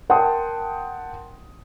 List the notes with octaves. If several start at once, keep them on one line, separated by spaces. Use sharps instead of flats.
A#4 F#5 G5 A5 C6 D#6